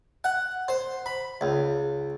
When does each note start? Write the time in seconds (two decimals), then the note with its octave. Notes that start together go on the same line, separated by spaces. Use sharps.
0.24 F#5
0.68 C5
1.06 B5
1.41 C#2